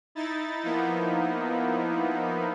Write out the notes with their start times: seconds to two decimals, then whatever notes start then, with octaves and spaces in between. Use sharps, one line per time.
0.15 D#4 E4 A6
0.63 F3 A#3 B3 D#4 E4